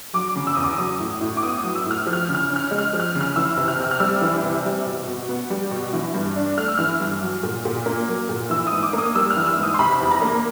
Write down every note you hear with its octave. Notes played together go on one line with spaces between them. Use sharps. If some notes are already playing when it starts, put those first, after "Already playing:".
F#3 D6
C#3
E6
E2 D#6
D6
D#6
F#3
A2
A2
D6
B3 D#6
D#6
F#3
E6
A2 F6
F3
F6
C#3
F6
C#4
F6
G#3
F6
F3
F6
C#3
F6
E3 E6
C3
F6
C3
F6
G3 E6
E3
C3
G3
B2
B2
B3
G3
B2
E3
G2
D4
A3 F6
E6
E3 F6
G2
F#3
A#2
A#2
A#3
F#3
A#2
E3 E6
G#2 D#6
D6
A#3 D#6
G3 E6
F6
E3
E6
G#2
D#6
C6
C3 B5
E2
A#5
A#3